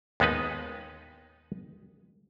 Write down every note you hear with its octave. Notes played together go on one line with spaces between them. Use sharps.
D#2 G#3 B3 D#4 B4